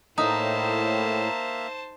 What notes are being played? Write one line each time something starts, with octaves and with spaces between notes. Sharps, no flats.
A2 A#3 D#4 C5 E5 A5 A#5